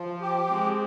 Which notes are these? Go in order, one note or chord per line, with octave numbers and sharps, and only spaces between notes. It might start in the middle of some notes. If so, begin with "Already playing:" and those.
Already playing: F3
G4
G#3 C4